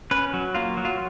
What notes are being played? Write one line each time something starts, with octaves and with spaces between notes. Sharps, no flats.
C#4 B4
F#3
A#3 F4
F#3
F4